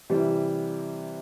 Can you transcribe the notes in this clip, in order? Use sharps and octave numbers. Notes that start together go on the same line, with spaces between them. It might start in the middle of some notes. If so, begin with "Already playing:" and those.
C3 E3 G3